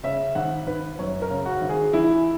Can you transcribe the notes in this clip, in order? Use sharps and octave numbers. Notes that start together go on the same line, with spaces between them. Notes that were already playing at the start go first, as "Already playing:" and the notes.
C#3 E5
G#1 F#5
G#1 B4
F#2 C#5
A#4
C#3
F#4
G#1
G#4
E3 E4